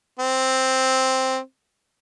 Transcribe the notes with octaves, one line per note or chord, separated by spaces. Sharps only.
C4